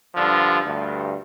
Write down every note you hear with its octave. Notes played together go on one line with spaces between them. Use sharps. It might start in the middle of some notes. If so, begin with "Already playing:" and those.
G2 D3 F3
D2 G2